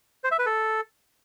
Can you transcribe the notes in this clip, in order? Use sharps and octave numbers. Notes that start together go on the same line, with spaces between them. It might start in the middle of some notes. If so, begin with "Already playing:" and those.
C5
E5
B4
A4